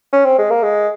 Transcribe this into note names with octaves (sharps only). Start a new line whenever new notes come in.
C#4
C4
G#3
A#3
G#3